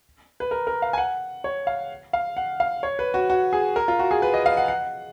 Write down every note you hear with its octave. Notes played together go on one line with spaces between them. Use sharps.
B4
A#4
A#4
F5
G#5
F#5
C#5
F5
F5
F#5
F5
C#5
B4
F#4
F#4
G#4
A#4
F4
F#4
G#4
B4
D#5
F5
F#5
F#5